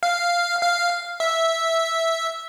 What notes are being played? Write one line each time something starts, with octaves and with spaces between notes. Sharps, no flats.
F5
F5
E5